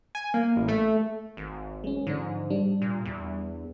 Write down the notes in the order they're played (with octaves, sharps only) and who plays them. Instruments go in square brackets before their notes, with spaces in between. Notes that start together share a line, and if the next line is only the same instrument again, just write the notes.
[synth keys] G#5
A#3
A1
A3
[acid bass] G#1
[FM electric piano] G#3 C#4
[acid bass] G#2 [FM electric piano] D3 F3 D4
[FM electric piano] G3 D4
[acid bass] A#2
E2